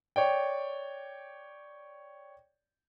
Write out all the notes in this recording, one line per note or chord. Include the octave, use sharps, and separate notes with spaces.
C#5 D5 G5